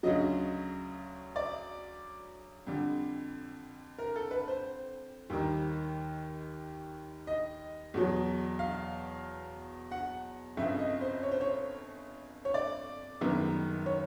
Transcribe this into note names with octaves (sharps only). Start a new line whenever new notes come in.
D2 C#3 F#3 D#5
D5
F2 D3 G3
A#4
A4
B4
C5
D#2 D#3 G3
D#5
E2 B2 F#3
F5
F#5
G1 F2 C#3 E5
D#5
C5
C#5
C5
C#5
C#5
D5
F#1 F#2 D#3 G3 B3
C#5